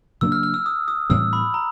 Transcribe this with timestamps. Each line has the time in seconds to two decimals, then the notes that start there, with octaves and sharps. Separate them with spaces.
0.21 C#3 F#3 A#3 D4 E6
0.32 F6
0.43 F6
0.54 E6
0.66 D#6
0.88 D#6
1.10 A2 E3 G3 C4 E6
1.33 B5
1.54 A#5